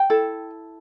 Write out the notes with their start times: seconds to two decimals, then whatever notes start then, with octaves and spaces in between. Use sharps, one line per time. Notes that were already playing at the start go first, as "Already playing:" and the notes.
Already playing: G5
0.10 E4 A4